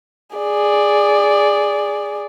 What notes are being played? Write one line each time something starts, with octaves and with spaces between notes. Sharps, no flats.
G#4 D5